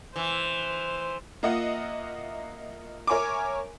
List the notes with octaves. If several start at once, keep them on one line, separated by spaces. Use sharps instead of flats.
E3 C5
A#3 F4 D#5 E5 F#5
A#4 C#5 E5 G#5 C#6 D6